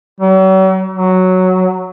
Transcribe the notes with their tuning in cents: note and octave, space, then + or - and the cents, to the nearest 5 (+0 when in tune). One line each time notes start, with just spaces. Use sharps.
F#3 +45
F#3 +0